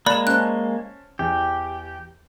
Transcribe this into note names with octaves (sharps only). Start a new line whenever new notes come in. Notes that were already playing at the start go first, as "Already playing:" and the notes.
G#3 A#3 D5 B5 F#6 E7
C#4 C5 A5 F#6
E2 G4